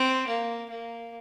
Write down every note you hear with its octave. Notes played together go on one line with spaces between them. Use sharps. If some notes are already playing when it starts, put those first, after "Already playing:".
Already playing: C4
A#3
A#3